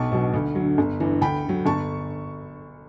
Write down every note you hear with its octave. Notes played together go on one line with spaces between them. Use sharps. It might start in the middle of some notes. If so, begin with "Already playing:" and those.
Already playing: B1 A5 C#6
B2 F#3
D2
D3 F#3
G1
G2 E3
D2 G5 B5
D3 F#3
G1 A5 C#6